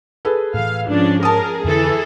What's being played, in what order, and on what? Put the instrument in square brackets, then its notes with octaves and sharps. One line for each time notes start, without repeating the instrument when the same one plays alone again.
[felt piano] G#4 A4 B4
[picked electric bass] A2 E3 [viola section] F5
[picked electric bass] G#2 [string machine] F3 C#4 [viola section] D4
[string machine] G#4 [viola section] A#4 [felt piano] A5 D#6
[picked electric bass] F2 D3 B3 [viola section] E3 A4